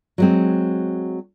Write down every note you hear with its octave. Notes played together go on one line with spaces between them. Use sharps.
F#3 G#3 C4